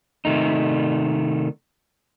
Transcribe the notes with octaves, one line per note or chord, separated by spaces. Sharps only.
C3 D#3 A3 D#4